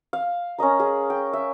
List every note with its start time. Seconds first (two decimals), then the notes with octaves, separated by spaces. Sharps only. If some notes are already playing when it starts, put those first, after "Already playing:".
0.13 F5
0.58 C#4 A#4 D#5 A#5
0.80 G#4
1.10 G5
1.33 E5